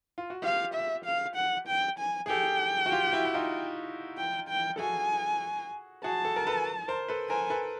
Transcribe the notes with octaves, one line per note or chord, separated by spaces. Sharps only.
F4
F#4
F4 G4 F5
E5
F5
F#5
G5
G#5
G#4
G4 A4 G5
F#4
F4 G4
G4
E4 F#4
E4
D#4 F4
G5
G5
A4
F#4 G#4 G#5
F#4 G#4 A5
A4
A#4
A4 B4
A#4 C5
A4 B4
A#4 C5 G#5
A4 B4